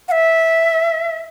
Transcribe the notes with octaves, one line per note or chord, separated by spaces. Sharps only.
F#5
E5